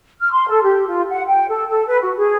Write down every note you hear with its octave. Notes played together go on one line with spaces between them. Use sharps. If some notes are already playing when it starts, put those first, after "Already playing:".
F6
C6
A4
G4
F4
F#5
G5
A4
A4
B4
F#4
G#4